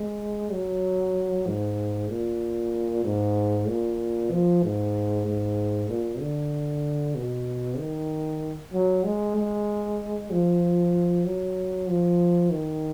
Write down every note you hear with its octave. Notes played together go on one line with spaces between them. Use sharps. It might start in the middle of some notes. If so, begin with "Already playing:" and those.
Already playing: G#3
F#3
G#2
A#2
G#2
A#2
F3
G#2
G#2
A#2
D3
B2
D#3
F#3
G#3
G#3
F3
F#3
F3
D#3